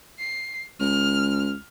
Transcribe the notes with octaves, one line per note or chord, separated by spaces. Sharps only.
C7
C#2 F6